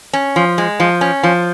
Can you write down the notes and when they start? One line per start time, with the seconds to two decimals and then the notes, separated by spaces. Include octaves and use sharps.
0.13 C#4
0.36 F3
0.58 G#3
0.80 F3
1.01 C#4
1.23 F3